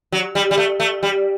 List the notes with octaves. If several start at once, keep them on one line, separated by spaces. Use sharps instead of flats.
F#3
G3
G3
A3
A3
G3